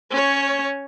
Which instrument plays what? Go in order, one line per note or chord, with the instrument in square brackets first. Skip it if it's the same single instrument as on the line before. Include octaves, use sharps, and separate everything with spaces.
[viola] C#4 C#5